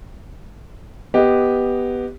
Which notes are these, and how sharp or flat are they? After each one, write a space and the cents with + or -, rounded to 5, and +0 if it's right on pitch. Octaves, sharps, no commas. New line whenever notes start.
B3 +0 G4 +0 D#5 +0